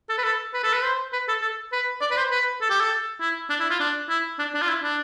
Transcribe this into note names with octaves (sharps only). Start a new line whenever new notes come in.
A4
B4
A4
B4
A4
B4
C5
B4
A4
A4
B4
D5
B4
C5
B4
A4
G4
A4
E4
D4
E4
F4
D4
E4
D4
D4
F4
E4
D4